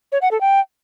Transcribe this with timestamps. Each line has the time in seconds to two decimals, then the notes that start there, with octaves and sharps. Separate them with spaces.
0.12 C#5
0.22 F#5
0.31 A4
0.41 G5